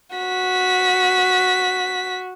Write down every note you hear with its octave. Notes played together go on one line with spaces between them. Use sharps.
F#4 B6